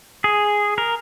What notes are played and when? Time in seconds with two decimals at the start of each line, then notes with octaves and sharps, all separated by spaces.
0.24 G#4
0.78 A#4